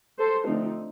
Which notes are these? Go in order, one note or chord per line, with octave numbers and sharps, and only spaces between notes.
A4 C5
D3 F3 A3 C4 D#4